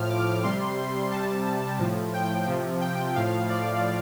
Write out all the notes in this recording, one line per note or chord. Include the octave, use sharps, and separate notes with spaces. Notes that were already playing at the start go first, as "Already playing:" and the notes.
Already playing: A2 F3 F6
D6
C3 G3 C6
C3 G3 A5
A2 F3
G5
C3 F3
G5
A2 F3 F5
D5